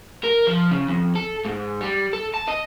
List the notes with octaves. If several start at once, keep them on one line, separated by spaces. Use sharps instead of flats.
A#4
F3
C#3
F2
A4
G#2
G3
A4
A5
D#5